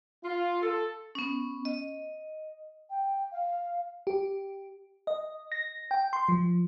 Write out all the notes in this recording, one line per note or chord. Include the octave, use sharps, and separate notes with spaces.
F4
A4
B3 C#4
D#5
G5
F5
G4
D#5
A#6
G5
C6
F3